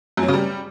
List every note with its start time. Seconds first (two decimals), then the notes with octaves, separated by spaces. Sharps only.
0.17 F#2
0.23 F#3
0.28 C#3
0.34 G3